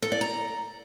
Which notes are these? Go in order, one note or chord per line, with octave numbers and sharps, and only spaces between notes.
A4
D5
A#5